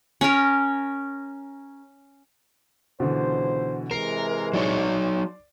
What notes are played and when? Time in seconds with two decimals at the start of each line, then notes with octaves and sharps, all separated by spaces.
0.21 C#4 A#4
3.00 C#2 B2 D3 E3 C5
3.91 C3 E3 G#3 A#4 C7
4.53 F#3 D#4 C#5 D5